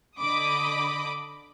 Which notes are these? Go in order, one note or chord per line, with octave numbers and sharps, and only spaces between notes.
D3 D#5 B5 D6 D#6